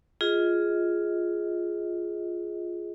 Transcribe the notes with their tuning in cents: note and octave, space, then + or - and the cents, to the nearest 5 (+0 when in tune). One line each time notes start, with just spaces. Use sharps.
F4 +0 G#4 +0 D#5 +25